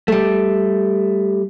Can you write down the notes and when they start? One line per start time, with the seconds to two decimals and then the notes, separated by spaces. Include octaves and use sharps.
0.08 G3 A3